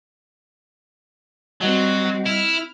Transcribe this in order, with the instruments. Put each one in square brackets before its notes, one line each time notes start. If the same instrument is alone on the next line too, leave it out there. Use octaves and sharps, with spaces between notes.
[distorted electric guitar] F#3 [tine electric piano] G3 D#5 F#5 [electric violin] C4 F#4
[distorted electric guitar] E4 [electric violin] F6